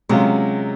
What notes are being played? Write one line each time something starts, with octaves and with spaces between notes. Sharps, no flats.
C3 F#3 G#3 C#4 F4